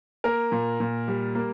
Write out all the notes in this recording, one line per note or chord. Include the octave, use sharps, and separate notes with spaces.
A#3 A#4
A#2
A#2
G3
A#3